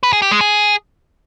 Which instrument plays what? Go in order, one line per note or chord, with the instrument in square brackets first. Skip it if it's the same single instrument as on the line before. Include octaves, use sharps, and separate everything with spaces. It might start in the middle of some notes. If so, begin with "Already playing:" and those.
[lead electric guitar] B4
G#4
G4
G#3
G#4